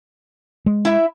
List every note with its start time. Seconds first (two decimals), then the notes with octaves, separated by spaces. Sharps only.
0.66 G#3
0.85 E4 E5